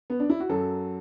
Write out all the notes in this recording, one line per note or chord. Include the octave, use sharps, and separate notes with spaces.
B3
D4
E4
F#4
F#2 F#3 A4